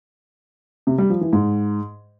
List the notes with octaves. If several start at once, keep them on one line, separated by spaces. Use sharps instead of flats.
C3
G3
F3
E3
G#2